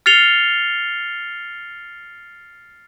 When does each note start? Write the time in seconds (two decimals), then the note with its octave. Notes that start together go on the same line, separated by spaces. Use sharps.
0.06 F6 A6 C7 C#7 F7 G7